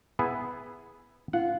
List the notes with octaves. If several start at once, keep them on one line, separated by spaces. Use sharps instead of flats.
B3 E4 G#4
F4 F#5